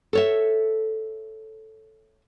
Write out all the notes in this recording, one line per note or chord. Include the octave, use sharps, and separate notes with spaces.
A4 C#5 E5